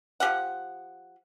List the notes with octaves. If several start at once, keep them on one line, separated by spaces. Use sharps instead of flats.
F3 G4 F5 F#5